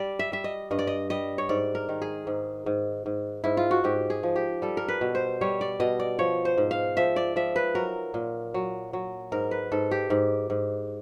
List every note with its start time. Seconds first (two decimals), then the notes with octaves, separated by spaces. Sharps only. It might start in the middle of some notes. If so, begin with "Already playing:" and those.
Already playing: G3 D5
0.19 E5
0.32 G3 E5
0.44 D#5
0.71 G2 D#5
0.79 D5
0.87 D#5
1.10 G3 D#5
1.38 C#5
1.49 G#2 D5
1.75 A#4
1.89 D#3
2.02 G#4
2.27 G#2
2.66 G#2
3.06 G#2
3.44 G#2 E4
3.57 F4
3.71 F#4
3.84 G#2 G4
4.10 G#4
4.23 F3
4.36 G4
4.62 G3 A4
4.77 A#4
4.88 B4
5.01 B2
5.15 C5
5.41 G3 C#5
5.61 D5
5.80 B2 D#5
6.00 D5
6.19 F3 C#5
6.45 C5
6.57 G#2
6.71 F5
6.97 F3 E5
7.16 D5
7.36 F3 E5
7.56 B4
7.75 F#3 A#4
8.14 A#2
8.54 F#3
8.93 F#3
9.32 G#2 A#4
9.51 B4
9.72 G#2 A4
9.91 G4
10.10 G#2
10.50 G#2